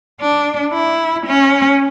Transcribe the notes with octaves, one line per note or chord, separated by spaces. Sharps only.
D4
E4
C#4